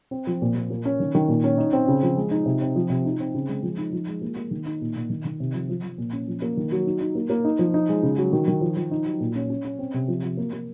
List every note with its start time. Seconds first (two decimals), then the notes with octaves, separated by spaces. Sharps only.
0.11 C4
0.27 F3
0.42 A#2
0.55 A#2
0.70 A#3
0.85 C#4
1.00 D#3
1.15 D#3
1.28 A#2
1.44 C#4
1.58 D#4
1.73 C4
1.88 C#3
2.03 F3
2.17 G#3
2.31 D#4
2.46 C3
2.61 C4
2.76 F3
2.90 C3
3.05 D#4
3.20 C4
3.35 C#3
3.49 G#3
3.63 F3
3.78 D#4
3.93 F3
4.08 G#3
4.22 A#3
4.36 A#3
4.51 D#3
4.66 D#4
4.81 A#2
4.96 A#2
5.10 D#3
5.25 D#3
5.40 C3
5.54 F3
5.69 F3
5.83 F3
5.98 A#2
6.13 C#4
6.28 F3
6.42 A#3
6.57 D#3
6.72 F#3
6.87 D#4
7.01 D#4
7.15 A#3
7.30 A#3
7.45 D#4
7.59 F3
7.74 D#4
7.89 G#3
8.03 C#3
8.18 F#3
8.33 D#3
8.48 D#3
8.61 F3
8.77 F3
8.91 D#4
9.05 F#3
9.20 A#2
9.35 C#4
9.50 C#4
9.65 C#4
9.79 C4
9.94 C3
10.08 F3
10.23 F3
10.37 A#3
10.53 A#3